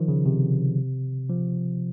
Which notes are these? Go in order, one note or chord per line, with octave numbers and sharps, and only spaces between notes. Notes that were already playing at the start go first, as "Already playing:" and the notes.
Already playing: D#3 F3
C#3
C3
F3